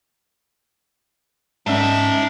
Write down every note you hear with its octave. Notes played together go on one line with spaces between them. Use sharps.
G#2 D#3 C#4 D#4 D5 E5 F#5 A5